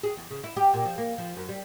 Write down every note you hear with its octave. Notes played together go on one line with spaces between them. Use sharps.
G#4
E2
C#3
E4
G4
A#2
F3
A#3
F3
F#2
G3